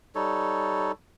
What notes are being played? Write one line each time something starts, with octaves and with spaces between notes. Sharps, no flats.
G3 D#4 A4 C#5